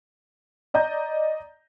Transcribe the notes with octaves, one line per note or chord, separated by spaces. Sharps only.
D5 D#5 A#5 G6